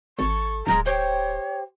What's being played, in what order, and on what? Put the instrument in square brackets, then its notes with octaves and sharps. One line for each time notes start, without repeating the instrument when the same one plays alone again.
[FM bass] G#1 [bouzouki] A4 [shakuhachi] C#6
[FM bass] D1 [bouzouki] G#3 A#3 C4 [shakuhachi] A#5
[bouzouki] G4 C5 G5 [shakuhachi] C#5